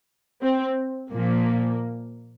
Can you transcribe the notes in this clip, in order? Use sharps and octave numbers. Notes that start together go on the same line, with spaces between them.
C4
A#2 F3 A#3